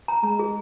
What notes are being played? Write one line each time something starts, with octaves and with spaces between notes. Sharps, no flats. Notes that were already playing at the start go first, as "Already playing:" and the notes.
A#5
G#3 A#5
G#4